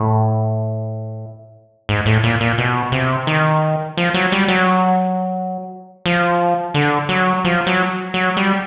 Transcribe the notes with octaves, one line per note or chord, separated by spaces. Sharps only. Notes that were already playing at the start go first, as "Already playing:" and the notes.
Already playing: A2
G#2
A2
A#2
A#2
B2
C3
D#3
F3
F#3
G3
F#3
F3
D3
F#3
F3
F#3
F#3
G3